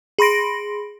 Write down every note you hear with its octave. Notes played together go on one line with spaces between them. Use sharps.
G#4 B5 C6 A#6 D7